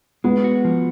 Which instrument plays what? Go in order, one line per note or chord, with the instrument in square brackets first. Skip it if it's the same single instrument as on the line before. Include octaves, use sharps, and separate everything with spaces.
[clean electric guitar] G#3 [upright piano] B3
[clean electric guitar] F#4
F3